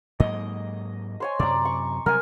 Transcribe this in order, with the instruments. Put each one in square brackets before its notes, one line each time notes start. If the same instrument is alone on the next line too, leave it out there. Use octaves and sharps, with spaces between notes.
[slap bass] G#2 F#3 A#3 [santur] D#5
[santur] C5 C#5 G#5
[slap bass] F#2 C3 [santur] D5 A#5
[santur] C#6
[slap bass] C3 F#3 G3 [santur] A#4 G#5